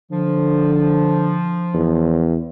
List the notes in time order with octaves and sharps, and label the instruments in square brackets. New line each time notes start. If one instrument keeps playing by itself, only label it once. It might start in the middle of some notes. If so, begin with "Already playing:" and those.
[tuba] D3 [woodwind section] F3
[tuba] E2